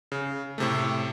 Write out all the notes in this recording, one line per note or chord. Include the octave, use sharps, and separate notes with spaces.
C#3
A2 C3 A3